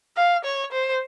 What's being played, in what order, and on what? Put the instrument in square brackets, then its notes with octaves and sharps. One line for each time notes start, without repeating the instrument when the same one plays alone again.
[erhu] F5
C#5
C5